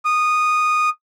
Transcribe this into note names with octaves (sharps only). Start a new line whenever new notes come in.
D#6